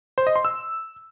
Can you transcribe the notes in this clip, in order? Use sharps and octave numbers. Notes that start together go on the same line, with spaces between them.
C5
D#5
C6
E6